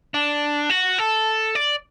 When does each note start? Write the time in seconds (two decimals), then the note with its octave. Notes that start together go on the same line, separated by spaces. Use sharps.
0.14 D4
0.70 F#4
0.98 A4
1.55 D5